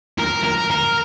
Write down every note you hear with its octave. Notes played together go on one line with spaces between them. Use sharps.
A#4
A#4
A#4